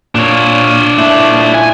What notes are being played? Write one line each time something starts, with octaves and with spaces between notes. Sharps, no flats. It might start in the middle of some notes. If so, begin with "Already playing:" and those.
A#2 D4 C#5
A#2 E4
G#5